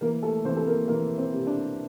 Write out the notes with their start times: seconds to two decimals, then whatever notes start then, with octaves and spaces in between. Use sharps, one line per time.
0.01 E3 A#3 A#4
0.23 A3 A4
0.45 E3 C4 C5
0.57 A4
0.67 A#3 A#4
0.88 E3 A#3 A#4
1.18 C4
1.33 C3
1.47 D4